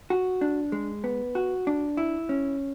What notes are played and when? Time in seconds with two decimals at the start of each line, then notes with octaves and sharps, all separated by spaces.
0.10 F#4
0.41 D4
0.72 G#3
1.04 B3
1.35 F#4
1.67 D4
1.97 E4
2.29 C#4